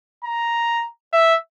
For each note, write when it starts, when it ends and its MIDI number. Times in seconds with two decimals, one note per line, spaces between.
0.24 0.85 82
1.13 1.35 76